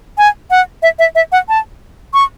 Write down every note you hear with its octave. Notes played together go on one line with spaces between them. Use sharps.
G#5
F#5
E5
E5
E5
F#5
A5
C#6